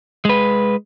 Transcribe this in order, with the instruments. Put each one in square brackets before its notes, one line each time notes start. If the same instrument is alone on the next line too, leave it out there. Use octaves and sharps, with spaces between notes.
[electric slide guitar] G#3 B4